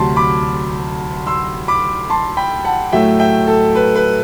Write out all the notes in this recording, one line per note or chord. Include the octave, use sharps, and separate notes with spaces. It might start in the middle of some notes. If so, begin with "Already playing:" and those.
Already playing: D2 C3 F#3 A5 C6
B5 D6
C6 E6
B5 D6
A5 C6
G5 B5
F#5 A5
A2 F#3 A3 E5 G5
E5 G5
A4
B4
B4